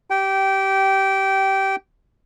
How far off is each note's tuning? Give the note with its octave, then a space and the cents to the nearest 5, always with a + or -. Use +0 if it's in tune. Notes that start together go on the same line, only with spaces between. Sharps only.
G4 -15 G5 -20